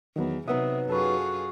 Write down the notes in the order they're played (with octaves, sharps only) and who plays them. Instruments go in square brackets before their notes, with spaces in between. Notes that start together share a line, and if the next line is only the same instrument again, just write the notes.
[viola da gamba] E2 [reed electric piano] D#3 F#3 B3
[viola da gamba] C3 [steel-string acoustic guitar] F#3 B3 D#4 [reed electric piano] E5 D#6
[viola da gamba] F#2 F4 G#4 [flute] F#4 [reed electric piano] A4 B4